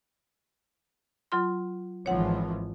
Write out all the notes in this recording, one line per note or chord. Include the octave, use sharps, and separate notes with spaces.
F#3 F4 C6
G#1 E3 F3 C#5 F#5